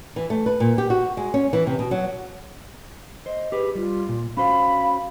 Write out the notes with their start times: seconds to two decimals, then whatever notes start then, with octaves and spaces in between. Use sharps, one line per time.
0.16 E3
0.30 A3
0.46 B4
0.60 A#2
0.78 G4
0.90 F#4
1.17 G#3
1.34 C#4
1.53 E3
1.67 C3
1.79 B2
1.91 F#3
3.26 C5 D#5
3.52 G4 G#4 B4
3.75 G3 F4
4.09 A#2
4.37 C#4 F#4 C5 F5 B5